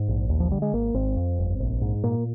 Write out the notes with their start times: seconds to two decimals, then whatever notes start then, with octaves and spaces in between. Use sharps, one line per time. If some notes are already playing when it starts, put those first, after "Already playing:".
Already playing: G#2
0.08 A#1
0.29 D#2
0.40 F3
0.51 D3 G3
0.62 G#3
0.73 G#1 A#3
0.94 G#1 C4
1.16 F2
1.39 G1
1.60 A#1
1.81 G#2
2.03 A#2 A#3